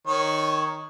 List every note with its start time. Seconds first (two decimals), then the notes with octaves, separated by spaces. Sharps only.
0.07 D#3 C#5